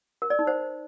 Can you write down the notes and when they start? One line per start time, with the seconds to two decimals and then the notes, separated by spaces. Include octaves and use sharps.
0.22 A#4
0.30 D5
0.39 D#4
0.47 C5